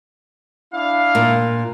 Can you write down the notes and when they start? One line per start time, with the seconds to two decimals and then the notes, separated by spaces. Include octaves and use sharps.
0.73 D4 E4 F5
1.15 A#2